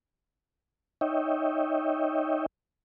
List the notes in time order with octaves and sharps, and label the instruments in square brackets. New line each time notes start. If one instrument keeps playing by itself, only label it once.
[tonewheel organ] D#4 C#5 D#5 E5 G5